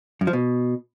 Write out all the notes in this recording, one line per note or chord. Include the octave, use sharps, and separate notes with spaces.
F#2
F3
B2